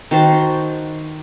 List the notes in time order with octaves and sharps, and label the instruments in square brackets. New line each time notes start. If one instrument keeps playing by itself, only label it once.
[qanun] D#3 F#4 C5 A5